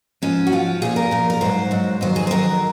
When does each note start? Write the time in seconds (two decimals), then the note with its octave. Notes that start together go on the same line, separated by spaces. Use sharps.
0.22 G#2 F3 C#4
0.47 F#4
0.52 G#2 F3 F4
0.82 A#2 F3 G#4
0.96 A#4
1.11 A#2 F3
1.30 A#4
1.41 G#2 F#3 C5
1.71 G#2 F#3
2.01 F2 D#3 F#3 C5
2.16 G#4
2.27 C5
2.31 F2 D#3 F#3 A#4